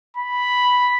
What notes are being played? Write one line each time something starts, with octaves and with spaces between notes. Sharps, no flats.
B5